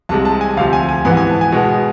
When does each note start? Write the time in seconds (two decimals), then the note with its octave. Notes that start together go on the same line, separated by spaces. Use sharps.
0.09 C2 C3 G#3 A5
0.25 A5
0.41 G#5
0.57 D2 C3 F3 F5
0.73 G#5
0.89 G#5
1.05 G#2 E3 B3 G#5
1.17 G#5
1.29 A5
1.41 G#5
1.52 B2 G#3 B3